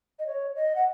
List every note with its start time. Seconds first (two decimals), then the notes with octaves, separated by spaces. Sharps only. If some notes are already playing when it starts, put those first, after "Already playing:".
0.19 D#5
0.27 C#5
0.56 D#5
0.75 F#5